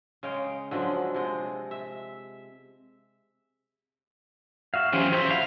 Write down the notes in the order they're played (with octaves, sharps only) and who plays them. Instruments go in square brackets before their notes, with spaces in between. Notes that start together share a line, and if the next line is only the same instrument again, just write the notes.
[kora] C#3 G#3 F5 G5
D3 F3 F#3 G#3
C3 G#3
E5
[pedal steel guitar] F#4 E5 F5
[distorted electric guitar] E3 F#3 [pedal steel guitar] C#4 G4 C5
[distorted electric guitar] F2 E5 [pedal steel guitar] C5
[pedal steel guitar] E4 F#4 [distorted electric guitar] F5